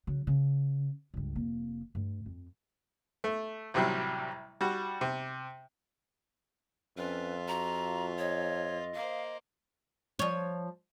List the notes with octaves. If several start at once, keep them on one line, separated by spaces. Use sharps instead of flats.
C#3 F#3
C#3
C#2 G2
F1 A#3
G2 A3
F2
A3
A1 C3 F#3 G3
G3 F#4
C3
F2 C#4 F4 B4 E5
F#4 A#5
C#5 D#5
A#3 C5 F5
F3 C#5